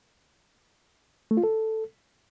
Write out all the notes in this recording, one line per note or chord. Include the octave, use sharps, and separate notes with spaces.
A3
F4
A4